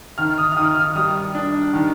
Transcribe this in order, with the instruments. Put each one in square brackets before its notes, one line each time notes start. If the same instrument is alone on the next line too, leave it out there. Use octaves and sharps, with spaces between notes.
[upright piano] D#3 F6
D#6
F6
D#3 D#6
F6
G3 D#6
D4
D#3